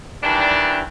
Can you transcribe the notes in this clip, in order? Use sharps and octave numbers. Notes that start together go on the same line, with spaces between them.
D#3 E3 G3 D4